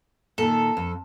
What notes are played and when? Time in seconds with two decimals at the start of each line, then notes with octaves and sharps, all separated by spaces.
0.38 A#2 D#3 A4
0.77 F2